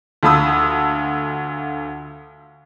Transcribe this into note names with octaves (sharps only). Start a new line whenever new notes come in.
D2 F4 A5 B5 D#6 E6